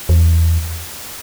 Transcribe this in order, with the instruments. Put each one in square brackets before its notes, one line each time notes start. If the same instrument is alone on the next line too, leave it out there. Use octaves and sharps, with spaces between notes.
[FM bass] E2